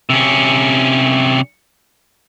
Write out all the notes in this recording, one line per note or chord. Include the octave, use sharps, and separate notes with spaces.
C3 C#4